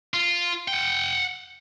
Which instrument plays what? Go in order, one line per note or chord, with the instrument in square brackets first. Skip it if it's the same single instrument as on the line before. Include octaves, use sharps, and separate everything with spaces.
[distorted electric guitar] F4
F#5 G5